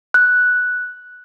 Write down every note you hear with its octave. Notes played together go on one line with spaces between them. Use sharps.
F#6